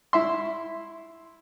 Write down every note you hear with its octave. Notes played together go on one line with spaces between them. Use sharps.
E4 E5 C6